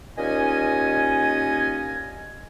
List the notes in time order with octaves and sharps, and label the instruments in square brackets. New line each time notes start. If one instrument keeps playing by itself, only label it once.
[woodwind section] D#2 A#2 C#4 D#5 G#5